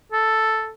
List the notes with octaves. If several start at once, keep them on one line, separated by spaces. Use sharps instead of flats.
A4